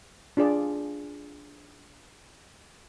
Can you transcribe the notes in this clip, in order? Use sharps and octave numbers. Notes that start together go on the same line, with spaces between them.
D4 F4 G#4 D5